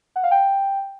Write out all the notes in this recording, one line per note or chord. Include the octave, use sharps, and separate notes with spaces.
F#5
F5
G5